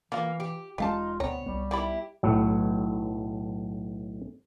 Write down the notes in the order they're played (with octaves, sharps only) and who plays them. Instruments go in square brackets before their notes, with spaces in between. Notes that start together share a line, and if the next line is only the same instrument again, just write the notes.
[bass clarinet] E3 [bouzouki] A#3 [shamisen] F4 F#4 F5
[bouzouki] G4
[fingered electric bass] E1 G#3 C#4 [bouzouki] D#4 [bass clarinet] F4 [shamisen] G4 F5 A5
[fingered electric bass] D2 B2 [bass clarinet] B3 [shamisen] C4 A#5 [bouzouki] C#5
[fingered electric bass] C2 B3 [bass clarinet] G3
[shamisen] D#3 D5 B5 [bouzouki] E4 G4
[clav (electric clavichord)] B1 A2 F#3